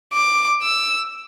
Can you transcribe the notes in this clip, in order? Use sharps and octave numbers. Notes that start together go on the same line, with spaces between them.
D6
E6